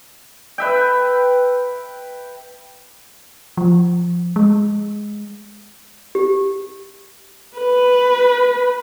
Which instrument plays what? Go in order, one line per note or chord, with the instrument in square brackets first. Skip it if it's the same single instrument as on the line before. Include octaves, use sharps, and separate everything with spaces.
[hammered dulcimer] B4 E5 G5
[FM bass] F3
G#3
[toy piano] G4
[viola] B4